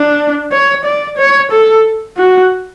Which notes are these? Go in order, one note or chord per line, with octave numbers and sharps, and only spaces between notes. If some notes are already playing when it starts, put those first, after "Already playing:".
Already playing: D4
C#5
D5
C#5
A4
F#4